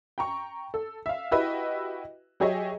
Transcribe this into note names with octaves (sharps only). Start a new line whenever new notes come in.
G5 A#5 C#6
A4
E5 F5
E4 F#4 G4 B4 D#5 E5
F#3 G4 G#4 C#5 D#5 E5